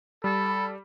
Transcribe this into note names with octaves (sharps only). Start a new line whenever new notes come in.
G3 A4 B5